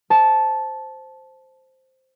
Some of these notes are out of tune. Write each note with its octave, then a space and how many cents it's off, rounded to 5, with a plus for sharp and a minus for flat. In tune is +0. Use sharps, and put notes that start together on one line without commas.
C5 +0 A5 -10